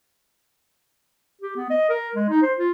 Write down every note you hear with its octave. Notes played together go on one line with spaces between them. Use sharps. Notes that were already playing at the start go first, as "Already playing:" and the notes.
G4
B3
D#5
A#4
G#3
D#4
C5
F4